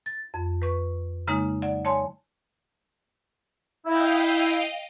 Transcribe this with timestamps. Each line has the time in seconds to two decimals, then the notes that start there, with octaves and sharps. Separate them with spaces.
0.06 A6
0.34 F2
0.62 B4 C#6
1.28 C#3 G#3 A#3 D#4
1.62 F#3 D5
1.85 C#5 G#5 A5 C6
3.86 E4 D#5 F5 G5